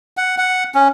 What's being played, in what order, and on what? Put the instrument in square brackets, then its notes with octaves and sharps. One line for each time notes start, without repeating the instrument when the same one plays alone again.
[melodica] F#5
F#5
C#4